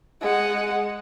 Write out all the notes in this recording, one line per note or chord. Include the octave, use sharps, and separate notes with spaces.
G#3 F#5